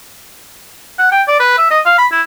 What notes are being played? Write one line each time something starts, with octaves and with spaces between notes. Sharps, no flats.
F#5
G5
D5
B4
E5
D#5
F5
B5
E4